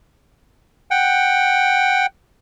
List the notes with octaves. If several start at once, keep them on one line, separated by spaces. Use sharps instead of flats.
F#5 G5